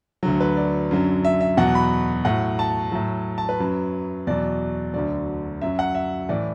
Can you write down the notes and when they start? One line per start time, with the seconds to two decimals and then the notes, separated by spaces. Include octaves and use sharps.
0.23 D2 D3 F#3
0.40 B4
0.57 D5
0.91 F#2 D3 F#3
1.25 E5
1.41 E5
1.57 E2 B2 F#3 F#5
1.75 B5
2.25 A2 F#3 F#5
2.59 A5
2.92 A2 F#3
3.38 A5
3.49 B4
3.60 F#2 F#3
4.27 E2 B2 F#3 D5
4.94 D2 D3 F#3 D5
5.61 F#2 F#3 E5
5.79 F#5
5.95 E5
6.29 A2 E3 D5